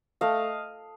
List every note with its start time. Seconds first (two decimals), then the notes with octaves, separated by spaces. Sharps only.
0.21 A3 D#5 F5